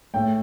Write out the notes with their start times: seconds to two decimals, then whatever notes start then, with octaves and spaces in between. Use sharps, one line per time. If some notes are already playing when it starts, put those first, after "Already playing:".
0.14 A2 A3 G5